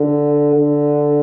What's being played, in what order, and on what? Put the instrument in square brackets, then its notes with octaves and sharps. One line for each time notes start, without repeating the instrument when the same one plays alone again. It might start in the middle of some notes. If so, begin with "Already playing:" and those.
Already playing: [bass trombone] D3
D3